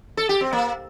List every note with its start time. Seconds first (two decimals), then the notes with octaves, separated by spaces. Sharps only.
0.17 A4
0.29 G4
0.41 C4
0.53 A#3